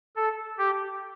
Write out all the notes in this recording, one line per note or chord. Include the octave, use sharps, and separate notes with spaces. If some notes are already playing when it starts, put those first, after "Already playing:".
A4
G4